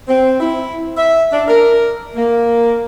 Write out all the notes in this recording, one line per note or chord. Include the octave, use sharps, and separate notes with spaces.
C4
E4
E5
D4
A#4
A#3